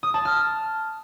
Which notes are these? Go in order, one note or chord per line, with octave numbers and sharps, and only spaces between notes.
D#6
A5
F6